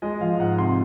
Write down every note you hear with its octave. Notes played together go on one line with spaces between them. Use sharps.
G#3 D#5
F3 F5
G#2 F#5
C3 C6